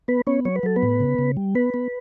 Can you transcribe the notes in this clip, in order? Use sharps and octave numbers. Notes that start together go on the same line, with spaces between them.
B3 B4
B3 C#4 C#5
F#3 C#5
B4
F#3 A4
B3 B4
A2
C#3
C#3
G3
B3 B4
B3